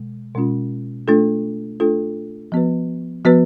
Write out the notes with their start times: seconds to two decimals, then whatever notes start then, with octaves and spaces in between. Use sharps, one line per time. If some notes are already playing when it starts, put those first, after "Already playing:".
Already playing: B2 G#3
0.35 B2 G#3 C#4 F4
1.08 A3 D4 F4 A4
1.80 A3 D4 F4 A4
2.52 F3 B3 F#4 B4
3.25 F3 B3 F#4 B4